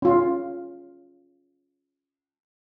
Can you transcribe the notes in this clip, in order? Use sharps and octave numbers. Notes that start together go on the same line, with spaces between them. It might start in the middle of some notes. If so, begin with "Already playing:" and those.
C#4 F4